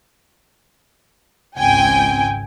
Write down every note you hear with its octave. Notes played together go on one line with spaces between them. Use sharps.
G#1 C#2 C4 G5 G#5